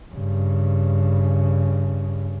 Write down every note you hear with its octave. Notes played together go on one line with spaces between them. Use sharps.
G2 C#3